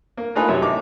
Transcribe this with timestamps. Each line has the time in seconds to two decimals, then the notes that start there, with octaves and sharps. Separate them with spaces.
0.17 A#3
0.35 A3 A#3 D#4 F4 G#4 B4
0.48 F#2 C3 C#5
0.62 A1 D#4 D6